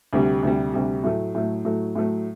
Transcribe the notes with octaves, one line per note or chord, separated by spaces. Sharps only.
D2 C3 G3
D2 C3 G3
D2 C3 G3
A2 F#3 A3
A2 F#3 A3
A2 F#3 A3
A2 F#3 A3